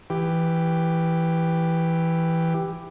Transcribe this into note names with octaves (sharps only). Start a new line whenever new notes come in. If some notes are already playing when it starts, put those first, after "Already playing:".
E3 G4